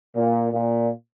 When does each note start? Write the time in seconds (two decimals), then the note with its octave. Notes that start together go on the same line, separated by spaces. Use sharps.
0.16 A#2
0.52 A#2